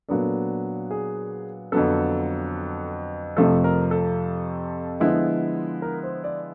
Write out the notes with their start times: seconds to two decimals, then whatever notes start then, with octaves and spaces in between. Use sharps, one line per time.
0.08 A#2 F#3 B3 D4 A4
0.91 G#4
1.72 F2 D3 F#3 B3 A4
3.37 F2 C3 F3 A3 A4
3.64 A#4
3.91 A4
5.00 D3 F3 G#3 B3 E4
5.82 A#4
6.03 C5
6.24 D5